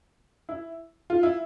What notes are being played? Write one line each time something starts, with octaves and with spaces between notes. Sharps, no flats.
E4
F4
E4